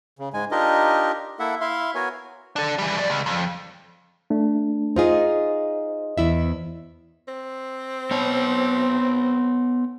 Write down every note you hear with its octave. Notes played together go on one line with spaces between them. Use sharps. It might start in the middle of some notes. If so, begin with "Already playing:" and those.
C#3
G#2 G#3 G#5
D4 D#4 F4 G4 A#4 D#5
A#3 E4 A4 E5 F#5
E4 E5 F5 C6
B3 F#4 A#4 C#5 G#5
D4 A4
E3 G3
G2 D5
C#2
F2
A3 D4
D#4 F4 G#4 C5 D#5
E2 E4 E5
C4
B3 C#5